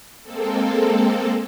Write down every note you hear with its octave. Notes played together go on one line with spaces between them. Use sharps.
G#3 A#3 C4 A4